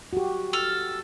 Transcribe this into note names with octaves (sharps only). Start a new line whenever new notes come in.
F#4 G4
A4 F6